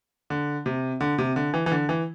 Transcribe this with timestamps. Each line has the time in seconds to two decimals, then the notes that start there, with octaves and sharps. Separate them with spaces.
0.30 D3
0.66 C3
1.01 D3
1.18 C3
1.36 D3
1.54 E3
1.66 E3
1.72 D3
1.89 E3